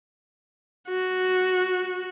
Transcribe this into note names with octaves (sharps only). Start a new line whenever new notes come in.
F#4